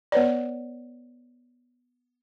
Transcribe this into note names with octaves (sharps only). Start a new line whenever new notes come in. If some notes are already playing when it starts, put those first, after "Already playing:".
B3 B4 C#5 D5